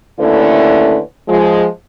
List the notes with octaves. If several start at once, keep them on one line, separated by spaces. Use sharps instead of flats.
D#2 D3 A3 C#4 E4 B4
F3 G#3